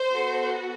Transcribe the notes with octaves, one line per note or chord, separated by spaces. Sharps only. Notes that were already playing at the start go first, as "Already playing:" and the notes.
Already playing: C5
B3 F#4 A4